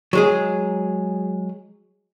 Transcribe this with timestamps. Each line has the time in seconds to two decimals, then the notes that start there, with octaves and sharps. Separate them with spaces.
0.13 F#3 G#3 G#4